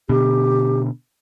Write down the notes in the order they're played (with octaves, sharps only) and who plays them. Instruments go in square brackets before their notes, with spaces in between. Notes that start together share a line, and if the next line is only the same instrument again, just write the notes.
[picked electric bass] B2 D3 [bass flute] G4